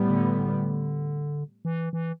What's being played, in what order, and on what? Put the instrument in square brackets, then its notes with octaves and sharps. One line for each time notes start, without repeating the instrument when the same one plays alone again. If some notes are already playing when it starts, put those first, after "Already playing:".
Already playing: [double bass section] A2 G3 B3
[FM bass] D3
E3
E3